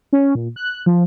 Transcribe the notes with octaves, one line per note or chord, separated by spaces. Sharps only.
C#4
A#2
F#6
F3